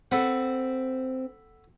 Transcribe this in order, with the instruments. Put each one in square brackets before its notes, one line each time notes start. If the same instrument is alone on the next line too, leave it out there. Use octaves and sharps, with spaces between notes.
[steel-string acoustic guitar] C4 [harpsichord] A4 B4 F#5